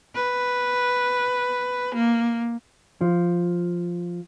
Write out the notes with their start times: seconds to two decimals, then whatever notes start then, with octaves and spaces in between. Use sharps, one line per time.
0.15 B4
1.95 A#3
3.01 F3